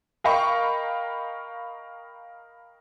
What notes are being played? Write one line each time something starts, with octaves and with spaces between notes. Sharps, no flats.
A#4 D#5 F5 G5 B5 C#6